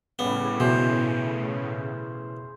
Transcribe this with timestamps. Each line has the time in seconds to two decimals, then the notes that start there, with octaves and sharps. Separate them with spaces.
0.19 A2 C#3 G3 B3
0.60 B2 E3 G#4 C5